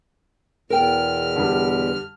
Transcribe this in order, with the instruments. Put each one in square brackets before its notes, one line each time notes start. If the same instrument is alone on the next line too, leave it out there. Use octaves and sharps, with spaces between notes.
[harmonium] E2 B2 [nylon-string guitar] A#4 G5 [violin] F6
[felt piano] D3 G3